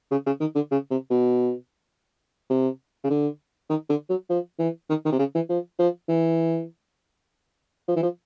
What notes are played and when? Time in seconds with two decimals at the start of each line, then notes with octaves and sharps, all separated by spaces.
0.11 C#3
0.26 C#3
0.40 D#3
0.55 D3
0.71 C#3
0.91 C3
1.10 B2
2.50 C3
3.04 C#3
3.10 D3
3.69 D#3
3.89 D3
4.09 F#3
4.30 F3
4.59 E3
4.90 D#3
5.05 D#3
5.12 C3
5.19 C#3
5.35 E3
5.49 F3
5.79 F3
6.09 E3
7.88 F3
7.96 E3
8.03 F3